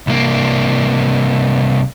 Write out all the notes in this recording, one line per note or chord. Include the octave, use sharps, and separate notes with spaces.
C2 A#3